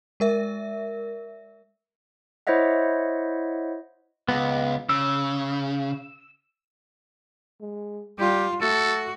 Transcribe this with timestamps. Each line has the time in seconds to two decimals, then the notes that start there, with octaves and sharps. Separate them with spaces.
0.20 G#3 A#4 E5
2.47 E4 C5 C#5 D#5 E5 F#5
4.29 C#2 B3
4.89 C#3 E6
7.61 G#3
8.19 G3 F4 G4
8.61 A3 F#4 A4